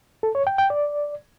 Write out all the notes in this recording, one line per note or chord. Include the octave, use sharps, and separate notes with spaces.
A4
C#5
G5
G5
D5